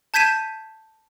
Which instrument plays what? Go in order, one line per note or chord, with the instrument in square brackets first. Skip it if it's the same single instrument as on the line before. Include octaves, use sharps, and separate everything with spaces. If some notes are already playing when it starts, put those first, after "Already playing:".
[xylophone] A5 G6 G#6 B6 D#7 E7